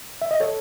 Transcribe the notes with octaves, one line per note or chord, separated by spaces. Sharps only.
E5
D#5
A4 C#5